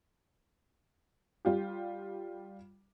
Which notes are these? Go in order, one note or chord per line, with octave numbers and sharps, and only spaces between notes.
G3 F4 G4